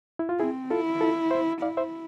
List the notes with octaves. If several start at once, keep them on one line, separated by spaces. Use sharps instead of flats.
E4
F4
C4 E4 G#4
E4 F4 A4
F4 A4
C5 E5
E4 D5 F5
C5 E5